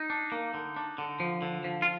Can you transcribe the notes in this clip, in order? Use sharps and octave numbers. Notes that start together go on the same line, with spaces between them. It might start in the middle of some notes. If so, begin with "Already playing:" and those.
Already playing: D#4
D4
A#3
D3
D4
D3
F3
D3
F3
F4